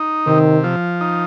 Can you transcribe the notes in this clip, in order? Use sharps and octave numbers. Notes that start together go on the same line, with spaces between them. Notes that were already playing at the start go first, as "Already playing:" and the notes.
Already playing: D#4
C3 D#3
F3
D#4